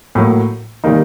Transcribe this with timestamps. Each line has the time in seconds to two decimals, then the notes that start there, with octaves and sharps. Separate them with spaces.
0.15 A2 F#3 A#3
0.84 C3 D#3 G3 A#3 D#4